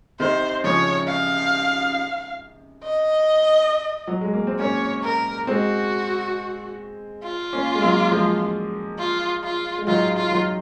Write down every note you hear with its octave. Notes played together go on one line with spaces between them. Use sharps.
C3 D#3 C5
C#3 F3 C#5
F5
D#5
F#3
G#3
A#3
C4
A#3 C#4 C#5
A#4
G#3 C4 F#4
F4
A#3 C#4
G#3
F#3 A#3
F3 G#3
F4
F4
G#3
D#3 F#3 F4
F4
D#3 F#3